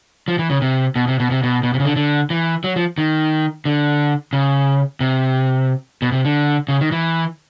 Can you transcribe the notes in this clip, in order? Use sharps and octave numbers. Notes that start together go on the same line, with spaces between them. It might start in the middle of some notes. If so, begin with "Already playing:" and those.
F3
E3
C#3
C3
B2
C3
B2
C3
B2
B2
C3
C#3
D3
D3
E3
F#3
F3
D#3
D3
C#3
C3
B2
C3
D3
C#3
D#3
E3